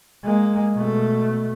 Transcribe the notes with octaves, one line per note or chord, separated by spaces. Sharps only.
G#3 A#3
B2 A3